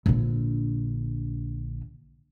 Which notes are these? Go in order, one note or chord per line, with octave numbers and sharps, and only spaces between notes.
A#1 D3